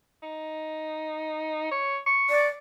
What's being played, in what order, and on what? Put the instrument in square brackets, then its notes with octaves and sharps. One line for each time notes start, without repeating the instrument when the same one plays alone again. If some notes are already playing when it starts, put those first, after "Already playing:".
[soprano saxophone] D#4
C#5
C#6
[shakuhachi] D5